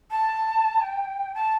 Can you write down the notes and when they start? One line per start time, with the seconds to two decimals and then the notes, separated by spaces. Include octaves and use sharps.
0.11 A5
0.81 G5
1.34 A5